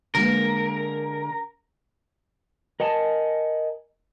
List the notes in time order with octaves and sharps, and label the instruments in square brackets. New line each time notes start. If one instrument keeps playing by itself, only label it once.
[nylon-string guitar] D3 G#3 A#3 [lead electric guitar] A#4
[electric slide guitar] A#4 D#5 F#5 G#5 A5